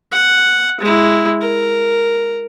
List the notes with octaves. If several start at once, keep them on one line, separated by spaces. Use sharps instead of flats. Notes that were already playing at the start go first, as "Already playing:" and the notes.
F#5
G#3 E4
A#4